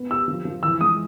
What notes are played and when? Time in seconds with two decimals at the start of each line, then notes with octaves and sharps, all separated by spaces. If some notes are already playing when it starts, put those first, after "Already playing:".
Already playing: B3
0.10 G4 E6
0.28 F3
0.45 F3
0.63 E3 E6
0.81 G#3 D#6